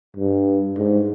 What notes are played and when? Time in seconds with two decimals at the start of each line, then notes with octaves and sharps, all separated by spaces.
0.17 G2
0.77 G#2